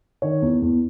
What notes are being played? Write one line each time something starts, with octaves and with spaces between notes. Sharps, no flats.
D#3 C#5
E2
E2